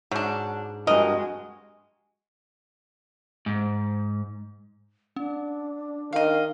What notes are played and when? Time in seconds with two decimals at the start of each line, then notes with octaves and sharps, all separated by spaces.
0.11 G#2 F#3 D4
0.87 G2 G#3 F#4 A#4 D#5
3.46 G#2
5.16 C#4 D4
6.13 D#3 D#5 F5